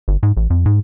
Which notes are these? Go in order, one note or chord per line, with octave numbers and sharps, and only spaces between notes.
G1
G#2
A1
F2
G#2